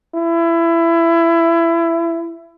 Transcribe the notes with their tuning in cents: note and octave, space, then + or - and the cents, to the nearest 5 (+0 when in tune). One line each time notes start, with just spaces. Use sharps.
E4 +25